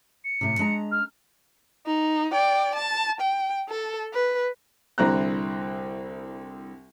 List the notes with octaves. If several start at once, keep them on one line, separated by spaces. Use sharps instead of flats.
C#7
A2 C3
G#3 D4 A#5
F6
D#4
D5 G5
A5
G5
A4
B4
C2 D3 C4 E4 A#5 F#6